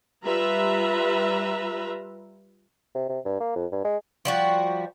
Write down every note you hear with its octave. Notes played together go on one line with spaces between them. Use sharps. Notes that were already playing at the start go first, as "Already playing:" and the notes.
G3 F4 B4 E5 A#5
C3
C3
G2
A#3
F2
G2
G#3
F3 G3 F#4